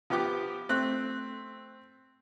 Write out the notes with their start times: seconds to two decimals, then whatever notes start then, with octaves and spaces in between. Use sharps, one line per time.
0.10 F3 B3 G4 G5 D6
0.69 A3 C4 F#6